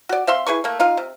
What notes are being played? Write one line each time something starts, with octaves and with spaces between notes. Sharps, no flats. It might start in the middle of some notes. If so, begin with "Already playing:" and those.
F#4 D5
C4 E5 F5 C6
E4 G#4 B4 C#6
A3 A#3
D#4 F4 F5
C3